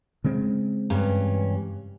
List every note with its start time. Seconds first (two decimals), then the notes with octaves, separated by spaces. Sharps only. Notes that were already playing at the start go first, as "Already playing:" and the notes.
0.24 C#3 G#3 C4
0.90 G2 E3 C#4